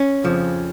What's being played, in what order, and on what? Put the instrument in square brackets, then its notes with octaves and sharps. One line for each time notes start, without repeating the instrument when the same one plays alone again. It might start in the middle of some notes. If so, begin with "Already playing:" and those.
Already playing: [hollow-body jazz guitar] C#4
F2 C#3 F3